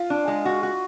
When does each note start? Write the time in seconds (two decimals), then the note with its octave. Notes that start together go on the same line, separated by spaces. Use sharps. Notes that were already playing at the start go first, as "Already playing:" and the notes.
Already playing: F4
0.10 D4
0.28 G#3
0.45 F#4
0.63 F#4